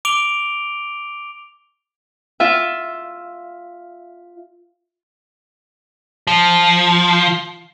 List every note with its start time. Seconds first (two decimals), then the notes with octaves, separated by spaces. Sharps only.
0.05 D6 D7 F7 G7
2.40 F4 E5
6.27 F3